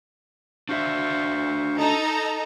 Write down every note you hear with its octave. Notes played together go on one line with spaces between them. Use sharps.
D4 F#4 C5 E5 F5 C#6
D#4 A4 A#5